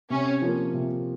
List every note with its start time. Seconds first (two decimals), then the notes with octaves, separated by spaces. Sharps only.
0.10 C3 C#4
0.42 F3 A#3
0.74 C3